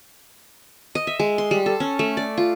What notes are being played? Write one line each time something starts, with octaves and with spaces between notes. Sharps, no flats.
D#5
E5
G#3
C6
G3
A4
C#4
A3
D5
F4